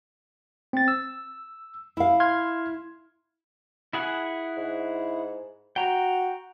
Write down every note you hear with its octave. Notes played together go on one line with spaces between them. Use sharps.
C4 A6
E6
E4 F5
C6 F6 G#6
E4 G#4 F#5
G#2
F#4 G5 A#5